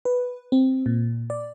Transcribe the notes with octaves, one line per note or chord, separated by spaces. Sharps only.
B4
C4
A#2
D5